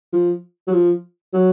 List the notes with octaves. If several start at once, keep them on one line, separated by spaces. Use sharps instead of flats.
F3
F#3
F3
F#3